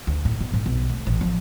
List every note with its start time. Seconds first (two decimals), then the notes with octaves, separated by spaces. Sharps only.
0.07 D2
0.25 A2
0.41 B2
0.53 G#2
0.66 B1
0.89 A3
1.07 A1
1.21 F3